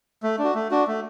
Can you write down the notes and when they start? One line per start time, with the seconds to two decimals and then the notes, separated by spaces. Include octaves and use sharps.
0.23 A3
0.39 D4
0.44 F#4
0.55 A3
0.71 D4 F#4
0.87 A3